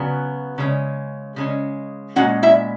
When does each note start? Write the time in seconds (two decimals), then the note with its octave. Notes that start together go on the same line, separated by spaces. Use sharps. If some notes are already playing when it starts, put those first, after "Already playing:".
Already playing: C#3 F#3 B3
0.58 C#3 G#3 C#4
1.36 C#3 G#3 C#4
2.16 A#2 G#3 C#4 F#4 F#5
2.43 E4 E5